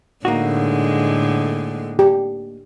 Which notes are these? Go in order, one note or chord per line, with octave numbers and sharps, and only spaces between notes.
A2 D3 G#3 A#3 D#4 F#4
G4